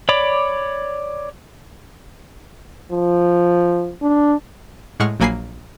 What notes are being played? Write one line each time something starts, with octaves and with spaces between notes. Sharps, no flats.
C#5 D5 B5 D6
F3
D4
A2 G#3 F#5 C#6 F6
A#1 F#3 A#3 G#5 B5 C7